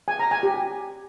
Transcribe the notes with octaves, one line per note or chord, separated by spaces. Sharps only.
G#5
A#5
G#5
G4